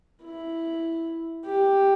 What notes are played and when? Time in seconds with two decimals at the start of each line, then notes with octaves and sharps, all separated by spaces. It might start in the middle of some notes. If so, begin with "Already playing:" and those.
0.23 E4
1.45 G4